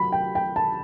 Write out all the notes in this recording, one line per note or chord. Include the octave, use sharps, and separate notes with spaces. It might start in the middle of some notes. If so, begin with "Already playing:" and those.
Already playing: F#3 B5
G5
G5
A5